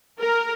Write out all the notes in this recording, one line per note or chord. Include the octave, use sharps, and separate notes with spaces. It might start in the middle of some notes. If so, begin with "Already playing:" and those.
A#4